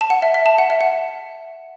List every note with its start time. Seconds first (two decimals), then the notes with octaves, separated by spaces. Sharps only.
0.01 A5
0.10 F#5
0.22 E5
0.34 E5
0.46 A5
0.58 F#5
0.70 E5
0.81 F#5